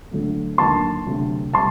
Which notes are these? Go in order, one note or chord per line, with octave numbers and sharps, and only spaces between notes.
D2 D3 F#3 A3
D#2 D3 F#3 A#3 A5 C6
D2 C3 F#3
C3 G3 A5 C6